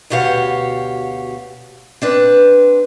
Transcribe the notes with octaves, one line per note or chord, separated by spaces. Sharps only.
D2 B2 G4 C#5 F5 F#5
C4 D4 B4